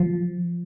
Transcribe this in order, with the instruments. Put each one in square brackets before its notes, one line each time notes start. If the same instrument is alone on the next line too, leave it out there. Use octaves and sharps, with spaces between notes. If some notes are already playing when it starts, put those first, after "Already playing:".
Already playing: [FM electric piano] F3